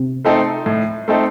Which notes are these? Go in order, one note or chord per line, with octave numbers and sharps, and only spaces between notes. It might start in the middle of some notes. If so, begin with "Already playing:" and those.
Already playing: C3
A3 C4 D#4 A4
A2
A3 C4 D#4 A4